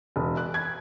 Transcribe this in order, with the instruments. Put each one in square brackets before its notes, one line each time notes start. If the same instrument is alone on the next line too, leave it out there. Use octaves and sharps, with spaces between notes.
[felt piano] E1
F#6
G#6